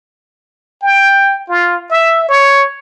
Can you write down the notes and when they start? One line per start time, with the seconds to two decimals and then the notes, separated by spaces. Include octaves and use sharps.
0.82 G5
1.49 F4
1.91 E5
2.29 C#5